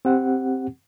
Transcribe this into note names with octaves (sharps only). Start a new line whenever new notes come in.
C4 G4 F#5